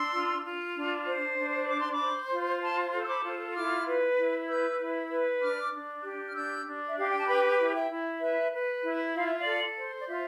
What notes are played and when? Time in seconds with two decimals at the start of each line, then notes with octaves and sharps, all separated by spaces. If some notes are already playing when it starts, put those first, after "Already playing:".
Already playing: D4 C6 E6
0.13 F4
0.44 F4
0.76 D4
1.07 C5
1.38 D4
1.69 C5 D6
1.80 C6
1.93 B5 D6
1.99 C5
2.31 F4
2.62 C5 A5 C6
2.93 A4
3.03 E6
3.08 B5 D6
3.24 F4
3.54 E4 D6 F6
3.86 B4
4.17 E4
4.48 B4 E6 G6
4.79 E4
5.10 B4
5.41 D4 D6 F6
5.73 D4
6.03 G4
6.27 F6
6.34 D4 E6 G6
6.65 D4
6.89 E5
6.97 G4 F5
7.09 G5
7.18 A5
7.27 B4 G5 B5
7.58 E4
7.74 E5 G5
7.90 E4
8.20 B4 E5
8.52 B4
8.83 E4
9.14 F4 F5
9.26 E5
9.38 D5 F5
9.45 A4
9.75 C5
9.99 D5
10.07 F4 E5